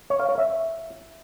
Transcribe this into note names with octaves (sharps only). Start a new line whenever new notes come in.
C#5
F5
C#5
E5